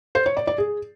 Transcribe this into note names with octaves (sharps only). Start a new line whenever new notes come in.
C5
C#5
D5
D5
G#4